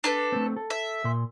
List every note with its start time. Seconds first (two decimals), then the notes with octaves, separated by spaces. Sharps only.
0.04 D4 A4 B4
0.32 A3 C4
0.56 A4
0.70 E5
1.04 A#2 C6